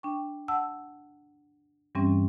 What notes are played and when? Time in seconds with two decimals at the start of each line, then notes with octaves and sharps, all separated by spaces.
0.03 D4 G5 C#6
0.48 F#5 A5 E6
1.95 G2 E3 G3 C4 C#4